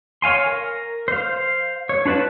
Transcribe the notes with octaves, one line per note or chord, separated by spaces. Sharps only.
C#5 F5 G#5 C6
A#4
C5 F5
C#5
D4 F4 B4 D5 A5